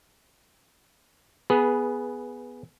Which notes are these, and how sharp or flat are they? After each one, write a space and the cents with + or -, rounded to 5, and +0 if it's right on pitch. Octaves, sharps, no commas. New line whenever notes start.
B3 +0 G#4 +0 B4 -20